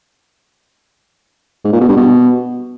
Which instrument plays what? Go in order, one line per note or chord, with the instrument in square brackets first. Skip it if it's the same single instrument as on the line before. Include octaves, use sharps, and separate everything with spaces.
[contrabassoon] G#2
A#2
B2
G2
B2